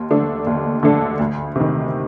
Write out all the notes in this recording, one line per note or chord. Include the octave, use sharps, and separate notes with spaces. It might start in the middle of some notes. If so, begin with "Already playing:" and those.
Already playing: D#2
D3 A3 D4 A4
D#2
D3 A3 D4 A4
D2
C3 D#3